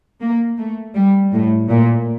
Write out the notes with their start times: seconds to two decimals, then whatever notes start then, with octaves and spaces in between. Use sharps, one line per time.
0.21 A#3
0.58 A3
0.95 G3
1.33 A2
1.69 A#2